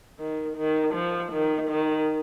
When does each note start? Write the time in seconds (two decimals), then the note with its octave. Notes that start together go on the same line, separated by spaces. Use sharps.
0.19 D#3
0.57 D#3
0.94 F3
1.32 D#3
1.70 D#3